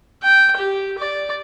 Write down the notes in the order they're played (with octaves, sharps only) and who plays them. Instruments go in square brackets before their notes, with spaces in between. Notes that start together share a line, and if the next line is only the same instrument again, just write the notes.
[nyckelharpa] G5
G4
D5